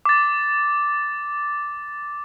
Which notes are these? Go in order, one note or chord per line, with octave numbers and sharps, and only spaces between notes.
D6 A6